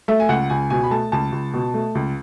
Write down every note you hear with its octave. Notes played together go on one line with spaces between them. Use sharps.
A3 E5
G#5
C#2 F#5
C#2 G#5
B2 G#5
B5
A3 A5
C#2 A5
C#2
B2
A3
C#2